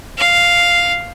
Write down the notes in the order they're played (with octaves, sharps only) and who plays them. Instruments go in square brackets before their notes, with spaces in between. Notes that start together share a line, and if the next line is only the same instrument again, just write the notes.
[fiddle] F5